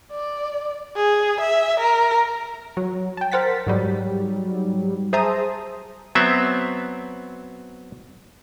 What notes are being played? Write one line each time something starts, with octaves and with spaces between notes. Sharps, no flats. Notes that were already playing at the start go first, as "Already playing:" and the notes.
D5
G#4
E5
A#4
F#3
G5 A5
A#4 C5 F#5 A6 B6
G#2 F#3 G3
G#4 C5 E5 A5 A#5 D#6
F#3 B3 C4 E5